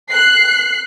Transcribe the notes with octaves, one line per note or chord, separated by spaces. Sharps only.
F#6 C7